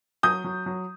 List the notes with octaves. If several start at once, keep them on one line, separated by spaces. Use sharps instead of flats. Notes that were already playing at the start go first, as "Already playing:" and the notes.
F#3 D#6 G6
F#3
F#3